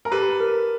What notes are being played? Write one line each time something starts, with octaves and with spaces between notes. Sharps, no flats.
A#4
G4 A4 B4
A#4